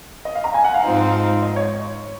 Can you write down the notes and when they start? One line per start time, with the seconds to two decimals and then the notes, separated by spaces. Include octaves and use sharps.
0.25 D#5
0.35 F5
0.44 A#5
0.54 G#5
0.64 F#5
0.74 F5
0.84 G#2 F3 C4 D#4
1.42 D#5
1.56 C#5